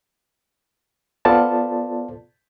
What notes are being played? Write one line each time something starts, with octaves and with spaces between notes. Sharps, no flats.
B3 F4 A4 C5 D5 A5